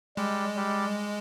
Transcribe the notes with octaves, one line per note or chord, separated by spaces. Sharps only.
G3 G#3
G3